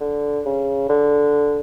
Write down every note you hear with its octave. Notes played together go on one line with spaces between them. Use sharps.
D3
C#3
D3